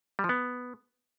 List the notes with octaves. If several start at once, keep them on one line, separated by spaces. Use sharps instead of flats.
G3
F3
B3